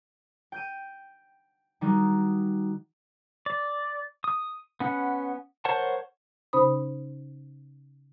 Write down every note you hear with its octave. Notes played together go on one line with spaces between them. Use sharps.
G5 G6 D#7
D#3 G3 D#4 F#4
D5
D#6
B3 C#4 F#5
A#4 C5 C#5 F#5 A5
C#3 C#4 D#4 C5 B5 D#6